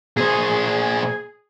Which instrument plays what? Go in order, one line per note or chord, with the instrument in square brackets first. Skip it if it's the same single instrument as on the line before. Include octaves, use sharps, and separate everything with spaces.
[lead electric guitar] A#2 C5 [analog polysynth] G#4